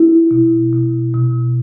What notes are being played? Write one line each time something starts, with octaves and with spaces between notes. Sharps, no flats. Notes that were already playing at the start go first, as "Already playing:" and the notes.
Already playing: E4
B2
B2
B2